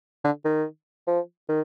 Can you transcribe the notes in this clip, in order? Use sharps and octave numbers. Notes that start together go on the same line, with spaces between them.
D3
D#3
F3
D#3